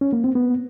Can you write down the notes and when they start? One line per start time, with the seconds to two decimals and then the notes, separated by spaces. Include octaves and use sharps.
0.01 C#4
0.13 A#3
0.24 C4
0.35 B3